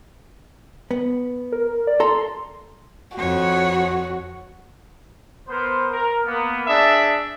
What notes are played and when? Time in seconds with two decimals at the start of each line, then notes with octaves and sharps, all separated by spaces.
0.91 B3
1.52 A#4
1.87 D5
2.00 A4 A#5 C6
3.17 F2 F#4 C#5
5.49 B3 A#4 C5
5.92 A#4
6.25 A#3 B3
6.67 D4 G#4 D5 E5